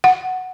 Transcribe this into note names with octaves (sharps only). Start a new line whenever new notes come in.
F#5